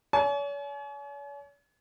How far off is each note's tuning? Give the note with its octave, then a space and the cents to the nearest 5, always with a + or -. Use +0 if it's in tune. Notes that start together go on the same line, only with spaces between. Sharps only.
C#5 +45 G#5 +40